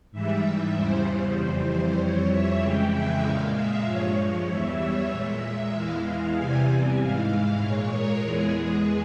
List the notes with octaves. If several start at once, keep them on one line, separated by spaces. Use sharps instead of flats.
G#2 E3 G3 E5
E5
E2 C#3 E3 G3 C5
C5
F2 E3 G3
C5
F2 E3 G3 C#5
E5
F2 C#3 E3 G#3 G5
E5
A#2 G#3 F5
E5
G2 F3 G#3 C#5
E2 E3 G3 E5
C#5
A#2 G#3 E5
E2 E3 G#3 F5
E2 C3 E3 G3 G#5
G#5
G#2 E3 G#3 F5
A#2 G#3 C#5
A#4
E2 E3 G#3 G#4
G#4